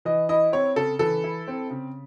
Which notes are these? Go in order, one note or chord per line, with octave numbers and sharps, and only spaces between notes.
E3 D#5
E4 D#5
C4 C#5
C#3 A4
E3 A4
E4
C4
C#3